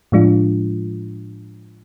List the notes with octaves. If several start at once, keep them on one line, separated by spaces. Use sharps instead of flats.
A2 F3 G#3 D4 F4